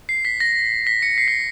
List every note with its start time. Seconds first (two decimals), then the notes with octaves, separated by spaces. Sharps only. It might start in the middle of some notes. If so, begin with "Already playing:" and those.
0.09 C7
0.25 B6
0.40 A#6
0.87 B6
1.03 C#7
1.18 C7
1.28 B6